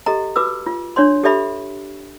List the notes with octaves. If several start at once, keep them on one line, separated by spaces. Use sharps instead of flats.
G4 A4 D#5 A#5
F#4 B4 D6 E6
F4
D4 C#5 D5 C6
G4 A4 D5 E5 B5